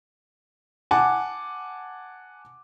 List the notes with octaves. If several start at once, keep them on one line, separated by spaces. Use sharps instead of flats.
F#5 G#5 A5 D6